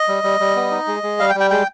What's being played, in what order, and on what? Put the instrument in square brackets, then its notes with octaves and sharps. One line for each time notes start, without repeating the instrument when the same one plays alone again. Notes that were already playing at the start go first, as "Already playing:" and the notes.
Already playing: [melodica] D#5
G3
G3
G3
B3
D#4
G#3
G#3
G3 F5
G5
G3
G5
G#3 G5